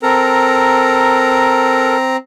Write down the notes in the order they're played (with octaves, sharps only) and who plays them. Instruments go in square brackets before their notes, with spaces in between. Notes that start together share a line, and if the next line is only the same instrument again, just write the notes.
[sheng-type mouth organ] C4 A#5 [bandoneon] A4 A#4